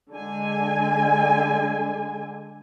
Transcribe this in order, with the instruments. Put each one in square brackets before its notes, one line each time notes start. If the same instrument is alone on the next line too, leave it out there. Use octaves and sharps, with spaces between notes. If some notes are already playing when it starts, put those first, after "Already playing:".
[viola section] D3 G#3 G#5